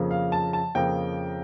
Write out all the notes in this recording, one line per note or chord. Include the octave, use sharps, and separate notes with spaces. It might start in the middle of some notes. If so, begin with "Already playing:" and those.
Already playing: F2 C#3 F3 A#3
F5
A5
A5
F2 C#3 F3 A#3 G5